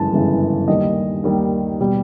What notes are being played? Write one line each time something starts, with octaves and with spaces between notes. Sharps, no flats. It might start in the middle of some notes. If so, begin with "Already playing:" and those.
Already playing: G1 F#2 C#3 E3 G#3 A5
G1 F#2 C#3 E3 G#3
D#2 D#3 G3 D#5
D#2 D#3 G3
B2 G3